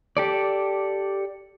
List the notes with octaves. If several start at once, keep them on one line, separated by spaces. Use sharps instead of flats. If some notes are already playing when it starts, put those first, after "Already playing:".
G4 A4 D5